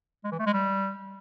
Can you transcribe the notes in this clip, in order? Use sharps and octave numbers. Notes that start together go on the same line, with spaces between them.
G#3
E3
A3
G#3
G3